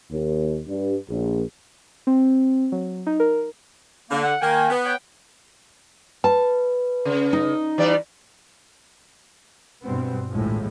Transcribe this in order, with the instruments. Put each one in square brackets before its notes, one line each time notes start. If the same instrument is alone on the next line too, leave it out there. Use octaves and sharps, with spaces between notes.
[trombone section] D#2
G2
A#1
[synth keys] C4
F#3
D#4
A#4
[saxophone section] D3 [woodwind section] A#3
[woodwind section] F#5
[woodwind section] D#3 G5 G#5 [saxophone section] A#3
[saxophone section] B3
[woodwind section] C#5 F#5 G5
[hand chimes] B4 [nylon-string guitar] A5
[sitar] C#3
[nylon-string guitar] D#4
[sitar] E3 G3 D5
[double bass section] G2 B2 B3 C4
A#1 D#2 A2 F3 G#3